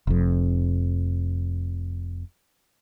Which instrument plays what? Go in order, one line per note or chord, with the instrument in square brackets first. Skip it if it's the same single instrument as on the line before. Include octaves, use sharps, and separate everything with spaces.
[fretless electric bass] F1 F2